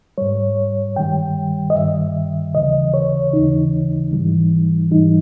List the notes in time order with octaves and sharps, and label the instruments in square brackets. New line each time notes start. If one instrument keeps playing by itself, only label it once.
[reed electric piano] G#2 G3 C#5
G2 D#3 G3 G5
D#5
G2 D#3 G3 E5
D#2 C#3 E3 D#5
C#5
D#2 C#3 E3 D#4
G#2 E3 G3
G#2 E3 G3 D#4